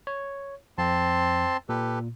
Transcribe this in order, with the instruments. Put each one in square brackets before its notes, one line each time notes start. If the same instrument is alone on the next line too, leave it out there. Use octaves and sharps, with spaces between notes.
[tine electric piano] C#5
[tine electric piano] F2 [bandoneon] C4 A5 C6
[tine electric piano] A#2 [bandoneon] G4 A4 B4